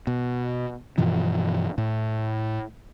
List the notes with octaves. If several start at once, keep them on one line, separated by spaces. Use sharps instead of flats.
B2
G2 B2 E3 F3
A2